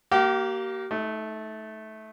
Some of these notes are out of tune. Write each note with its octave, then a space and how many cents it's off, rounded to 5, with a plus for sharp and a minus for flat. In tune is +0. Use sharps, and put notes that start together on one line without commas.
A#3 +0 G4 -40
A3 -15 D#4 +25